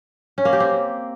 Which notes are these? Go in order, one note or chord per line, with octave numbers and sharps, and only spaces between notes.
C#4
A#3
G4
C4